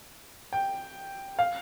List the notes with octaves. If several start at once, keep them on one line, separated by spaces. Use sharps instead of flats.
G5
F5